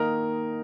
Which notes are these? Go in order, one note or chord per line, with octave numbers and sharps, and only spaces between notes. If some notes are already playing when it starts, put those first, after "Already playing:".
Already playing: D#3 A#3 D#4 A#4